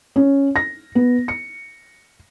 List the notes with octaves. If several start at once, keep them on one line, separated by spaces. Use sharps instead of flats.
C#4
A#6
B3
C#7